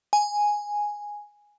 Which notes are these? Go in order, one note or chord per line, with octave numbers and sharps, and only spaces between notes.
G#5